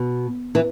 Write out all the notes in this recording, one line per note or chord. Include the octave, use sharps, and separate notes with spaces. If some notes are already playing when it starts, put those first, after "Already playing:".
Already playing: B2
E3